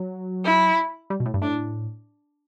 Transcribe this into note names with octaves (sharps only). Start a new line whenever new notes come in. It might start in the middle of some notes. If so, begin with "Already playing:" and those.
Already playing: F#3
E4
G3
B2
A2
G2
A2 D4